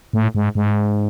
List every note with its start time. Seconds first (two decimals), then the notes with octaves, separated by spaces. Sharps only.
0.13 A2
0.35 G#2
0.55 G#2